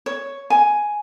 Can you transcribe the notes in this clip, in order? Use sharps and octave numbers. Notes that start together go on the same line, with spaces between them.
C#5
G#5